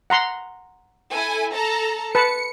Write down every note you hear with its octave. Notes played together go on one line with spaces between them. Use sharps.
F#5 A#5 C6
E4 A4 G#5
A4 A5 A#5
B4 A5 C#7